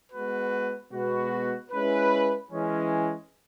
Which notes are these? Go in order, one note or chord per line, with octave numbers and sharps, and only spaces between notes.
G#3 B3 F#4 B4
B2 G#3 B3 F#4 B4
G#3 C#4 E4 B4
E3 G#3 C#4